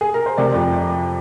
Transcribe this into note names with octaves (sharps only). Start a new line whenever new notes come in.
G#4
A#4
C5
C3 D5
F2